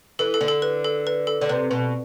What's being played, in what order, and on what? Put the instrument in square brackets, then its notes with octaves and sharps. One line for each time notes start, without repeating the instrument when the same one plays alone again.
[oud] E3 [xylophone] A4
[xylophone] A4
[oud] D3
[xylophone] A4
B4
A4
B4
A4
[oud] D3
[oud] C3 [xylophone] B4
[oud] B2